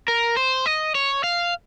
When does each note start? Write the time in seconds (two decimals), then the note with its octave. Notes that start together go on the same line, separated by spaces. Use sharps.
0.08 A#4
0.37 C5
0.66 D#5
0.95 C#5
1.24 F5